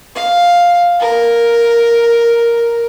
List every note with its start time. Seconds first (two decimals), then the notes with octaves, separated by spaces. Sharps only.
0.16 F5
1.01 A#4